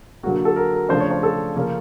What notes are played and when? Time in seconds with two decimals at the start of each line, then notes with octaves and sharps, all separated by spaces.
0.23 D3 F#3 A#3 F#4
0.45 A4
0.56 A#4
0.74 A#4
0.89 C#3 F3 A3 D4 C5
1.00 C#5
1.11 C5
1.23 A4
1.55 C#3 F3 A#3 C#4